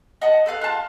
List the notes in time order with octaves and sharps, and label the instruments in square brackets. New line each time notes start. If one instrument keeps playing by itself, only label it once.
[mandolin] D#5 F#5 A5
A4 B4 F5 F#6
F4 A5